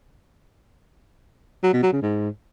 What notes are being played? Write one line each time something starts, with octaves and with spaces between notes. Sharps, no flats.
F#3
B2
F#3
C#3
G#2